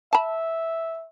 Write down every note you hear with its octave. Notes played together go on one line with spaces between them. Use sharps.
E5 A5 B5